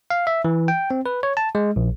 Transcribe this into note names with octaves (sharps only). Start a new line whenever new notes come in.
F5
E5
E3
G5
C4
B4
C#5
A5
G#3
A#1